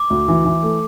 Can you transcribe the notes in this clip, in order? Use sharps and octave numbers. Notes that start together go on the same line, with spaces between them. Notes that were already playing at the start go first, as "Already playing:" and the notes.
Already playing: D6
D2
E3
E3
A3